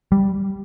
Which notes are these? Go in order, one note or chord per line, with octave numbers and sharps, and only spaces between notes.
G3